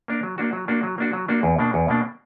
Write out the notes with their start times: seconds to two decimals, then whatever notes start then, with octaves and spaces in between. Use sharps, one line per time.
0.08 A#3 D4 A#4
0.23 F#3
0.38 A#3 D4 F#4
0.53 F#3
0.68 A#3 D4 F#4
0.83 F#3
0.98 A#3 D4 F#4
1.13 F#3
1.28 A#3 D4 F#4
1.43 E2
1.59 B2 A#3 D4
1.74 E2
1.88 B2 A#3 D4